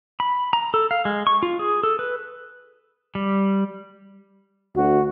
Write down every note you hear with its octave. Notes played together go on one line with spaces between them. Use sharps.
B5
A#5
A4
F5
G#3
C#6
F4
G#4
A4
B4
G3
D2 F#4